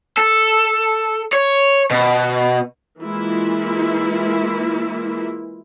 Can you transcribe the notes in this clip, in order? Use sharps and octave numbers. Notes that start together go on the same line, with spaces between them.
A4
C#5
B2
E3 G#3 A#3 E4 F4